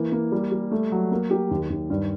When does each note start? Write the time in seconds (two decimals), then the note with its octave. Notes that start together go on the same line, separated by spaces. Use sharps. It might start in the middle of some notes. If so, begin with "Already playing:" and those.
Already playing: E3 A#3
0.12 A#3
0.32 G3
0.52 G3
0.72 A3
0.92 F#3
1.12 A#3
1.31 G4
1.51 D#2
1.70 D#2
1.90 G2